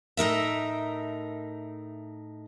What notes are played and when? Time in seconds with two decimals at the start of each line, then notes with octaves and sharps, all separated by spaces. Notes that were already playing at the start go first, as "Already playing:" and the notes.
0.17 A2 D#4 A#4 E5